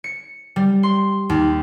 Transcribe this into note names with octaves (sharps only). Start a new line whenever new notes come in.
C#7
G3
C6
D#2